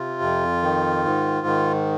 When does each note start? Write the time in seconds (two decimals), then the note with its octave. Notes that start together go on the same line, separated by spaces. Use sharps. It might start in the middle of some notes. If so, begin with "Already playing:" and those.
Already playing: C3 F4
0.22 F2
0.62 D#3
1.05 G#2
1.47 D#3